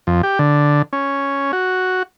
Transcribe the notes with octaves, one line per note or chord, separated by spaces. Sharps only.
F2
G4
D3
C#4
F#4